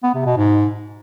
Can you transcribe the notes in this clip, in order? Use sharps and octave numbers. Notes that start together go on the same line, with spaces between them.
B3
C3
B2
G#2